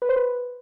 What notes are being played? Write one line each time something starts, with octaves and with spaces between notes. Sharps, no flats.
B4
C5
B4